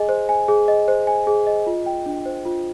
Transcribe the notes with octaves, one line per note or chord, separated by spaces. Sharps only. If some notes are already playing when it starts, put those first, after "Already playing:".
Already playing: G#4 D#5 G#5
C5
G#5
G#4
D#5
C5
G#5
G#4
D#5
F4
G5
D4
C5
F4